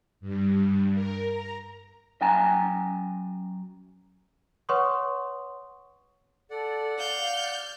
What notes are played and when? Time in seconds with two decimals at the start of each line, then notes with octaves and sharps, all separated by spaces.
0.20 G2
0.94 A#4
1.26 A#5
2.21 F#2 G5 G#5 A#5
4.69 B4 C#5 F#5 C6 C#6 D#6
6.50 A4 D5 F#5
6.99 F5 F6 G6